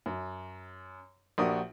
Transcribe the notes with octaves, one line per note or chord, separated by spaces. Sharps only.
F#2
A#1 D4 F#4 G4 A#4 D#6